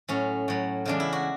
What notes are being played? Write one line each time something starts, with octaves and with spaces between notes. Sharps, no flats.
A2 F#3 C#4
A2 F#3
E2 C#3 G#3 D4
E4
F#4